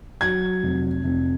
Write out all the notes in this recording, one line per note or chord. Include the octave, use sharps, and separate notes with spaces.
F#3 G#6
F1
F1